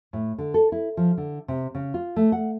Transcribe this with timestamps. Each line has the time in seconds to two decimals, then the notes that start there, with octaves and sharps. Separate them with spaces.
0.13 A2
0.38 D3
0.54 A4
0.72 E4
0.97 F3
1.17 D3
1.48 C3
1.75 C#3
1.94 F4
2.16 A3
2.32 F#5